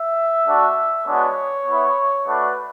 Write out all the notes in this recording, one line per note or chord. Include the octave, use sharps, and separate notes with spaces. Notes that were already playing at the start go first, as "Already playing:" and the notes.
Already playing: E5
A3 D4 F#4
G#3 B3 D4 F#4 C#5
B3 E4
A3 D4 F#4 B4